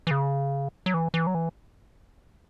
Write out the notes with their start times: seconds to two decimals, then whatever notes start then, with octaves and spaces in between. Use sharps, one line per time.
0.07 E3
0.11 C#3
0.86 F#3
0.94 E3
1.14 E3
1.27 F#3
1.35 E3